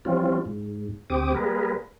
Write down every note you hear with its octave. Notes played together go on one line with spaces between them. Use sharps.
E3 F3 G3 C4 C#4 F4
G#2
D2 C4 G4 D6 D#6
G3 A#3 G#4 A#4 B4